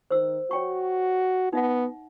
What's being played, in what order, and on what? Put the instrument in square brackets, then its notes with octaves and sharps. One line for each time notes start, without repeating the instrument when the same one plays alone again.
[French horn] D#3 [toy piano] C5 E6
[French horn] F#4 [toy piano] C#5 G5 C#6
[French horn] B3 [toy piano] D#4 E5 F#5